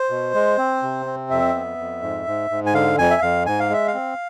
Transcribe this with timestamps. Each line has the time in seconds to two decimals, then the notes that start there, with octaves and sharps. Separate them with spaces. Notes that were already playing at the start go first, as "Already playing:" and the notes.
Already playing: C5
0.10 B2
0.34 G#3
0.58 C4
0.82 C3
1.06 C4
1.30 F2 E5
1.54 B3
1.78 F2
2.02 G#2
2.26 G#2
2.50 G#2
2.66 G#5
2.74 D3 F5
2.98 F2 G#5
3.10 E5
3.22 F2 F5
3.46 G#2 G#5
3.60 F5
3.70 G#3 E5
3.87 F5
3.94 C4